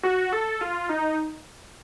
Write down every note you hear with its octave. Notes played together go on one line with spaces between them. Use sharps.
F#4
A4
F4
D#4